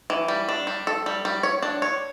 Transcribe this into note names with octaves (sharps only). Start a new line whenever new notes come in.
E3
G3
D4
G3
A4
G3
G3
C#5
D4
C#5